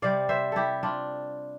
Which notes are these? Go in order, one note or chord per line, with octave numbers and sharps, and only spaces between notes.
C3 G3 D5 F5
C5 E5
E4 G4 A4
D4 F4